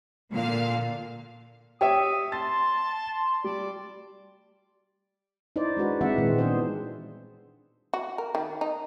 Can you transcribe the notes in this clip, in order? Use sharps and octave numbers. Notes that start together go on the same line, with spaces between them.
A#2 D3 F5
G4 C#5 E5 G5 D#6
A5 C6 A6
G3 D5
D#4 E4 C5 D5
G#3 D4 F#4 B4
E3 G#3 C4 E5 F#5
A#2 D#3 G#3 C4
E3 G3 B3 D4 G#4 C5
F#4
A#4
D#3
D#4